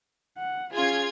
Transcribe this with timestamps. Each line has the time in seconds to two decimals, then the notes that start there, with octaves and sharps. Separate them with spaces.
0.38 F#5
0.73 C#4 F4 G#4 G#6